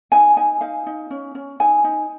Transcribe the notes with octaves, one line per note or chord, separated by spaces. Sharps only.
D#4 G#5
D#4 G#5
D#4 F5
D#4
C#4
C#4
D#4 G#5
D#4